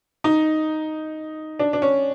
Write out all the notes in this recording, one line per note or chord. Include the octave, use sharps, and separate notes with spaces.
D#4
D4
D4
C#4